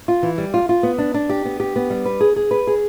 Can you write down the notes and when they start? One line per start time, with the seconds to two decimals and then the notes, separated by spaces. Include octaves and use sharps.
0.08 F4
0.23 E3
0.38 G3
0.54 F4
0.69 F4
0.83 B3
0.98 D4
1.14 D4
1.30 G4
1.45 B3
1.60 G4
1.76 B3
1.90 G3
2.06 B4
2.21 G#4
2.36 G#4
2.51 B4
2.67 G#4